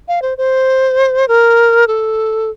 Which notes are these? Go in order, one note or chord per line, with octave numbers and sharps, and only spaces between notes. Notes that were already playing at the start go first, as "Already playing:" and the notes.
F5
C5
C5
A#4
A4